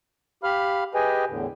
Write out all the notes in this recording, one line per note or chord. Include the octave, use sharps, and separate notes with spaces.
G4 F5 B5 F6
G4 G#4 B4 D#5 G5 G#5
E2 A2 D3